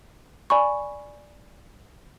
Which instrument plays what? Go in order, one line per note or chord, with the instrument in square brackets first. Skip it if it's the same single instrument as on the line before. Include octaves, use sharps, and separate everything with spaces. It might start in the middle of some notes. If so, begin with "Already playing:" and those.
[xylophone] D5 G#5 B5 C#6